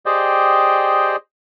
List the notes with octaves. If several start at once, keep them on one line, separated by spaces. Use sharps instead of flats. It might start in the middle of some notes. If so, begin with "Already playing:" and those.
G4 G#4 C5 D5 D#5 G5